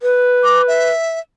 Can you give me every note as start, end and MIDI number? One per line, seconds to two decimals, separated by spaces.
0.02 0.90 71
0.44 0.62 86
0.68 1.20 76